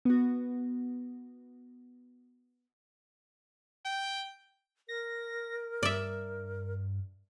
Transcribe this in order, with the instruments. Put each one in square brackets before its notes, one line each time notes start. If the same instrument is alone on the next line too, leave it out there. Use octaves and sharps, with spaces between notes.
[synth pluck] B3 F#4
[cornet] G5
[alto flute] A#4 [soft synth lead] A#6
[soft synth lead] G2 [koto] D5 E5